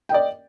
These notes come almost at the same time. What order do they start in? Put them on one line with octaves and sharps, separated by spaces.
G5 D#5 D5